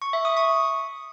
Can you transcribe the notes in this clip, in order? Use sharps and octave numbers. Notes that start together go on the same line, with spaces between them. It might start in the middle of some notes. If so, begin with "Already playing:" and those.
C#6
E5
D#6
C#6